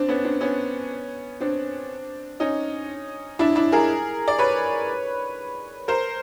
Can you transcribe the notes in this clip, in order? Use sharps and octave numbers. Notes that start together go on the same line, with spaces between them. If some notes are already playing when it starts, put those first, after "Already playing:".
Already playing: C4 D4
B3 C#4
C4 D4
B3 C#4
C4 D4
C#4 D#4
D4 E4
D4 E4
G#4 A#4
D5
B4 C#5
A#4 C5